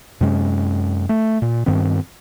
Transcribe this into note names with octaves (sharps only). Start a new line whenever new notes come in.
F#2 C3 G#3 C#4
A3
A#2
G2 D#3 B3 C4